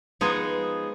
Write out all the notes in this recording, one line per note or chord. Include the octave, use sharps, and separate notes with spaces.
F3 G#3 B3 D#4 G#4